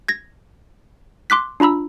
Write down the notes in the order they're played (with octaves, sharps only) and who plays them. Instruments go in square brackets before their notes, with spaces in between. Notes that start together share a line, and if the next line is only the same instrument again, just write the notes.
[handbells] G#6 A#6
C6 D6 F#6 B6
D4 F4 A#5 B5 E6